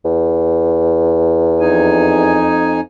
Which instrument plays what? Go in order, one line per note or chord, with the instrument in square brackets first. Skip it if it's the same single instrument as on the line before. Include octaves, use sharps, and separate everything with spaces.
[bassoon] E2
[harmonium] F2 D#4 G#5